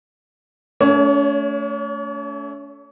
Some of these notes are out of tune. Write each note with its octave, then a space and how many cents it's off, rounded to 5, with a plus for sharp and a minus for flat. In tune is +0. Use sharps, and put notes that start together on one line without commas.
A3 +0 C#4 +45 C#5 +10